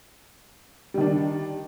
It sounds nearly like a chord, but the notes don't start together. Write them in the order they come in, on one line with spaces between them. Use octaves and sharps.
G3 D#3 D4